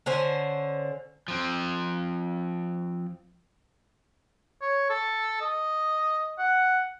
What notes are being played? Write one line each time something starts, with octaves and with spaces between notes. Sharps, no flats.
D3 C#4 C5 G#5
F3 C4
C#5
A4
D#5
F#5